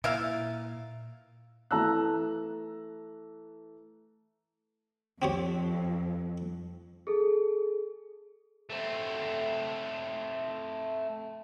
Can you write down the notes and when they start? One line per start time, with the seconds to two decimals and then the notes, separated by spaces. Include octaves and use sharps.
0.04 A#2 E4 E5 F5
1.71 E3 A3 A5 A#5 E6 F#6
5.22 F2 C4 G4 C#5
7.07 G#4 A4
8.70 A3 C4